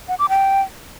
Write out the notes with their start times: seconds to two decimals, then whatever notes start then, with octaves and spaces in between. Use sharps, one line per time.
0.08 F#5
0.19 D6
0.29 G5